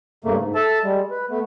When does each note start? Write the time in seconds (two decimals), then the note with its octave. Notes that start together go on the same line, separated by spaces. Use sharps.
0.24 G2 C#3 A3 A#3
0.36 G#2
0.55 A4 E5 A5
0.83 G3 G#3
1.10 B4
1.30 A3 B3